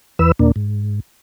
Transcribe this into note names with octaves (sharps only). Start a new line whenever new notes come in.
E2 E3 B4 E6
D#2 A#2 A#3 D4
G#2